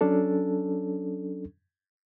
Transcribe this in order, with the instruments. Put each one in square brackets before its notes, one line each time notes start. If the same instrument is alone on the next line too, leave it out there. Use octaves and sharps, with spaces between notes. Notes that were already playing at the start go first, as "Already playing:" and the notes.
[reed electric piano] F#3 C#4 D4 A4